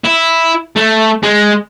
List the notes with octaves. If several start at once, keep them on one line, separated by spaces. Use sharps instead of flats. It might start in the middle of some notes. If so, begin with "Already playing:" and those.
E4
A3
G#3